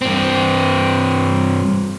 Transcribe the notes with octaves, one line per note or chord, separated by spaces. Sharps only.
G2 C4